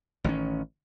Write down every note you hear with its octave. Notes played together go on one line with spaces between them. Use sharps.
A1 D#3 G#3 C#4